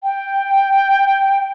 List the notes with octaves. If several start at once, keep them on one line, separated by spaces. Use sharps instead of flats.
G5